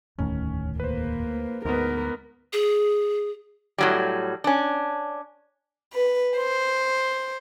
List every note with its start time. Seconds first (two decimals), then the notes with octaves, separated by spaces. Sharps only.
0.19 E1 D2 A2 D#3 C#4
0.80 A#3 B4 C5
1.65 D2 G#2 B3 A#4 B4
2.53 G#4
3.78 A2 F#3 G3
4.44 C#4 D4
5.93 B4
6.38 C5